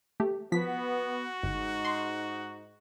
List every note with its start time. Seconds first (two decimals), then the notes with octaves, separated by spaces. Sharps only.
0.20 A3 G4
0.52 F3 B3 F#4 B6
1.43 G1 G#2 D#4
1.85 C6